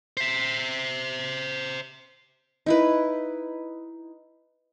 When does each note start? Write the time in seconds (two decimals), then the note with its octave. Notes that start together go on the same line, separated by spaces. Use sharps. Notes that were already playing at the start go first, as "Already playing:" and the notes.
0.17 C5 E5
2.66 D#4 E4 B4